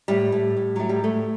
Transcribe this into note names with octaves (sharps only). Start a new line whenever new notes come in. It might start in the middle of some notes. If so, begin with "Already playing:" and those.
A2 G3
A2
A2
A2 F#3
G3
A2 A3